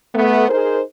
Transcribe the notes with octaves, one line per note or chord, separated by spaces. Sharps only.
A3 B3
D#4 G#4 A#4 C5